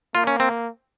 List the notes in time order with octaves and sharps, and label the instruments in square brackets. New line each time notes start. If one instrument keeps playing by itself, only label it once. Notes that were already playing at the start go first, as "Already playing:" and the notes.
[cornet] A#3 [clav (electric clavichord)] F4
[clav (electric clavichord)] C#4
C4